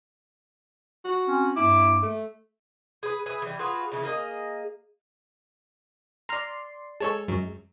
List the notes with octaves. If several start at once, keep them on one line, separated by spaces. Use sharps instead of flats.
F#4
C4 C#4
G2 A#3 E4 D6
A3
G#4 B4
G#4 B4 E5
E3 G3
F4 F#4 G#4 B4
C#3 E3
A#3 G#4 A#4 D#5
D5 A#5 C6 F6
G#3 A4 C#5 A5
F#2 F#3